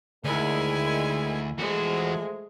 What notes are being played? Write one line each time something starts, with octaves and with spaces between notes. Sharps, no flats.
D2 D#3 G#3 E4 G#5
E3 F3 G#3 A3 F#4